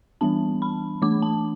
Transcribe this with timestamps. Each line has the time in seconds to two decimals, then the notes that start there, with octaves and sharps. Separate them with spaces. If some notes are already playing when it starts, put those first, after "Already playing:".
0.21 E3 G3 B3 D4 A5
0.62 B5
1.02 E3 A3 D4 D6
1.22 A5